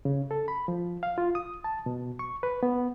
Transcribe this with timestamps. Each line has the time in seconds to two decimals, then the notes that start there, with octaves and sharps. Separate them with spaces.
0.05 C#3
0.31 A4
0.48 B5
0.68 F3
1.03 F5
1.18 F4
1.35 D#6
1.64 A5
1.86 B2
2.19 C#6
2.43 B4
2.63 B3